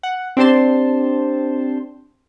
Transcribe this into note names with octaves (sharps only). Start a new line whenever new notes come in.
F#5
C4 D4 G4 C5 A5 C6